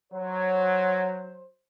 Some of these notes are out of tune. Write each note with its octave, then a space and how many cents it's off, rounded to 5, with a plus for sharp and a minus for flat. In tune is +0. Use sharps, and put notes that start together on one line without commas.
F#3 +0 C5 +10